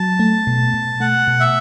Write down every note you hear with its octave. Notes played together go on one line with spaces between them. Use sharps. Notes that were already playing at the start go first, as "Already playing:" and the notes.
Already playing: F#3 A5
A3
B2
B2
A3 F#5
B2
E5